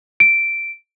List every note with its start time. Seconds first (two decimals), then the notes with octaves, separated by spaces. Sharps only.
0.20 D7